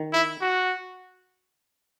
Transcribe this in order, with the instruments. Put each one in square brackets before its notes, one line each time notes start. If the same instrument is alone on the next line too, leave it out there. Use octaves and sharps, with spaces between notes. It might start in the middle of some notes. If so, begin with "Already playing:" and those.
Already playing: [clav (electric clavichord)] D#3
[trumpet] E4
F#4